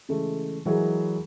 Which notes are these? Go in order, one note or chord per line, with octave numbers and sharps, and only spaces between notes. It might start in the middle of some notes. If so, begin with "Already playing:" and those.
C#3 E3 G#3 A3
E3 F#3 G#3 G#4 A#4